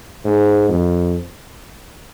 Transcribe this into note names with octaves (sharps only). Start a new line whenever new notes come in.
G#2
F2